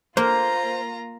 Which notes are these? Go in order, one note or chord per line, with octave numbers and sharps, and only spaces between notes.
A#3 F4 C5 A#5